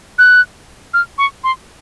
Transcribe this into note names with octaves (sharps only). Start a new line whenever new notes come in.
F#6
F6
C#6
C6